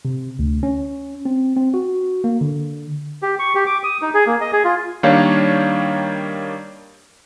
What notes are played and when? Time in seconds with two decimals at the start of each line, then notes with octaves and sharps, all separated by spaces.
0.05 C3
0.39 D2
0.63 C#4
1.25 C4
1.56 C4
1.74 F#4
2.24 A#3
2.41 D3
3.22 G4
3.39 C#6
3.55 G4
3.66 D6
3.83 D#6
4.02 D#4
4.14 G#4
4.27 A#3
4.41 D#5
4.53 G#4
4.65 F4
5.03 D#3 G3 A#3 D4 C#5 F5